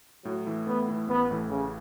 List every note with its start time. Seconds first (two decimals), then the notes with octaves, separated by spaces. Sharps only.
0.25 A2 F#3
0.47 E3 A3 E4
0.67 A2 B3
0.88 E3 A3 E4
1.08 A1 B3
1.30 A2 E3 A3 E4
1.50 A1 C#3